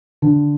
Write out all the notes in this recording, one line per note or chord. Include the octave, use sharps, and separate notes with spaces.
D3